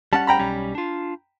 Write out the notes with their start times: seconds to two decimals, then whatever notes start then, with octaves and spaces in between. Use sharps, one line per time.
0.13 G3 C#4 F#5 A5
0.27 G5 A#5 B5
0.39 B1 G3 C#4
0.75 D4 F4